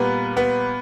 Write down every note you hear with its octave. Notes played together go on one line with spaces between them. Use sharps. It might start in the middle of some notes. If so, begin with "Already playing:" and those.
Already playing: A#2 G3 A#3 B3 B4
B3 B4